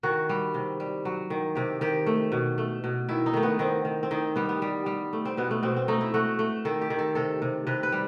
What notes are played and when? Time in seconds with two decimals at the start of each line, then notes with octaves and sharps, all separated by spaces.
0.03 D#3 F#4
0.29 G3
0.54 C3
0.80 G3
1.05 F#3
1.30 D#3
1.55 C3 G4
1.81 D#3 G4
2.06 A3
2.32 B2
2.58 A3
2.84 B2
3.09 D#3 E4
3.26 D#4
3.34 D#3 A3
3.43 B3
3.59 D#3 C4
3.85 D#3
4.03 C4
4.11 D#3 D#4
4.36 G3 B3
4.49 B3
4.62 G3
4.86 G3
5.13 A3
5.25 C4
5.37 B2 B3
5.51 A3
5.63 B2 C4
5.76 C4
5.88 A3 D#4
6.01 E4
6.14 A3 F#4
6.39 A3
6.65 D#3 A4
6.81 G4
6.90 D#3
6.99 A4
7.15 C3 A4
7.42 C3
7.67 C3 B4
7.83 B4
7.92 G3